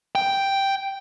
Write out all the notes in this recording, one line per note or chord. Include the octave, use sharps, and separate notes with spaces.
G5